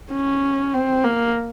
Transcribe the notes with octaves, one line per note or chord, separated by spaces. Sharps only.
C#4
C4
A#3